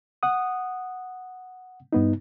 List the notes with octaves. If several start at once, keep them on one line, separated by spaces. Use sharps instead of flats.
F#5 D#6
G2 B3 D#4